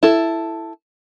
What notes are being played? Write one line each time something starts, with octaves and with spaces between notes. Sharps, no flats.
E4 A4